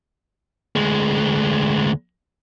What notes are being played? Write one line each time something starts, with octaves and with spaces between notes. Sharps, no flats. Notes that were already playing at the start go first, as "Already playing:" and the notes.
D2 G#3